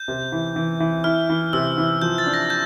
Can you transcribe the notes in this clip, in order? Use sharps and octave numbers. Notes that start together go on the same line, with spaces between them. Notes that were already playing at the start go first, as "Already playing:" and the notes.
Already playing: G6
C3
E3
E3
E3
E4 F6
E3
C3 E6
E3
F3 G6
A6
D4
A#6
G6